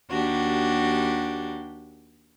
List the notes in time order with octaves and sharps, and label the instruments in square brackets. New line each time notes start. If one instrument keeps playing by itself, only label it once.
[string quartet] D#2 D4 F#4 G4